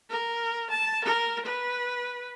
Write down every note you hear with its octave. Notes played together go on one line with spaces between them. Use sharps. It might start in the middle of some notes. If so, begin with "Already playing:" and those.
A#4
A5
A#4
B4